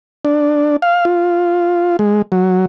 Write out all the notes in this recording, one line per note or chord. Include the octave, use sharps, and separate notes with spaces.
D4
F5
F4
G#3
F#3